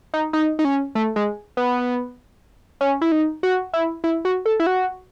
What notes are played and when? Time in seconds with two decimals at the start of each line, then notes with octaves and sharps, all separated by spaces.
0.14 D#4
0.33 D#4
0.59 D#4
0.65 C#4
0.95 A3
1.16 G#3
1.57 B3
2.81 C#4
3.01 E4
3.12 D#4
3.43 F#4
3.74 E4
4.04 E4
4.25 F#4
4.46 A4
4.60 E4
4.67 F#4